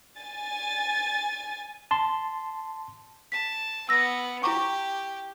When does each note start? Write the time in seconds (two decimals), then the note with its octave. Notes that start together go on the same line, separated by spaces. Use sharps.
0.19 G#5 A6
1.91 A5 C6
3.32 A5 B6
3.89 B3 E6 A#6
4.43 E4 G4 A#5 C#6 D6